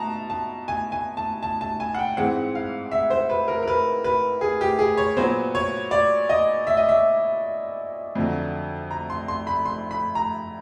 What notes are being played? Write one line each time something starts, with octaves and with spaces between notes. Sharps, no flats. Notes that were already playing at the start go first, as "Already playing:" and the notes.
Already playing: B2 A5 A#5
A5
G#5
G#5
A5
A5
A5
G#5
F#5
G5
G#2 E3 G#3 C4 F#5
F5
E5
C5
B4
A#4
A#4
B4
B4
G#4
G4
G#4
C#5
A#2 F#3 B3 C5
C#5
D5
D#5
E5
D#5
E5
F2 D3 F#3
A#5
C6
C6
B5
C6
B5
A#5